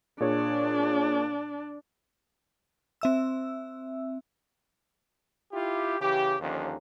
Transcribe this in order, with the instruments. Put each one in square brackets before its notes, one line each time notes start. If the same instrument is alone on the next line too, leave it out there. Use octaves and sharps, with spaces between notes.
[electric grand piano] A#2 G#4 C#5 [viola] D4
[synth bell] C4 E5 E6
[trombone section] E4 F4 G4
C#3 E3 G4
D#2 D3 F3 C#4 D#4